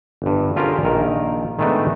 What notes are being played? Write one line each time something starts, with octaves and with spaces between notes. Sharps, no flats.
G1 G2
D3 C#4 F4 G4 G#4 A#4
A#1 D#3 A#4
D#3 G#3 A3 B3 D4 D#4